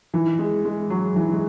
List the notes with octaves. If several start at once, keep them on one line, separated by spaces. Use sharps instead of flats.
E3
G#3
G#3
F#3
E3
G#3